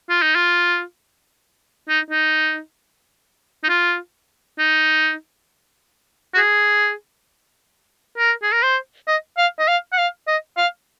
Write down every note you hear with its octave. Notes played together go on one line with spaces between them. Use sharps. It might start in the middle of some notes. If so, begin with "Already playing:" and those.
F4
D#4
F4
D#4
D#4
D#4
F4
D#4
F#4
G#4
A#4
G#4
A#4
C5
D#5
F5
D#5
F5
F#5
F5
D#5
F5